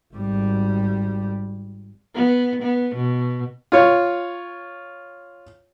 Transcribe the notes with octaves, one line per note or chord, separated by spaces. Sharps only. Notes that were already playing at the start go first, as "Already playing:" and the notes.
G#1 G3
B3
B3
B2
F4 C#5